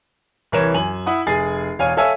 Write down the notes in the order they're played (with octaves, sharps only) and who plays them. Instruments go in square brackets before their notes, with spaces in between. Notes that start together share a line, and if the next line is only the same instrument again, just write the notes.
[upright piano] C2 E3 A#4 C#5 E7
F#2 G#5 F#7
E4 F#5 D#6
F1 G#4 G#5 A6 C7
E1 C#5 F5 G#5 F6 D#7
A4 C#5 E5 F5 G#5 E6